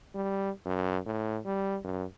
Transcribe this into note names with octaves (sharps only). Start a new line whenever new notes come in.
G3
F#2
A2
G3
F#2